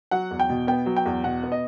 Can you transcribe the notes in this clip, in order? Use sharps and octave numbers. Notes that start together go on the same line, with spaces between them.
F#3 F#5
E2
G5
B2
B3 G5
F#3
G5
E2
B2 F#5
B3
D#5